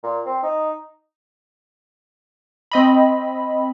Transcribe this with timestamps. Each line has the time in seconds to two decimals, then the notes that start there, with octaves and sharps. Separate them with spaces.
0.03 A#2
0.26 C4
0.43 D#4
2.72 C4 D#5 B5